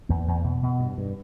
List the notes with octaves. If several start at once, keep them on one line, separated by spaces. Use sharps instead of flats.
E2 A#3
E2
B2
B2
G2
G2